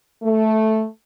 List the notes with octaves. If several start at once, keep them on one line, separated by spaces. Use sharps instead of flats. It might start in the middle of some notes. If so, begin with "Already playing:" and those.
A3